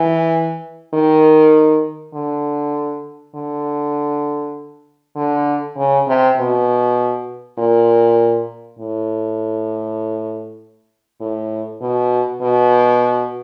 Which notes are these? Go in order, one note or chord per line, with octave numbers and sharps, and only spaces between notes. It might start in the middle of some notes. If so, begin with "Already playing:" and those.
Already playing: E3
D#3
D3
D3
D3
C#3
C3
B2
A#2
A2
A2
B2
B2